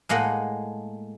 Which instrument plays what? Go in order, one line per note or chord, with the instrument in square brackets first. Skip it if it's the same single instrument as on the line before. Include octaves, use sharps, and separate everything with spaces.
[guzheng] A2 G#3 A#3 D#5 F#5